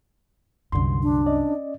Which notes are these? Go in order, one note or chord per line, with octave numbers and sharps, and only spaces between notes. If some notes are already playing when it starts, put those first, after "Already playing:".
C2 F#2 D3 C6
D4
C#4 D5 D#5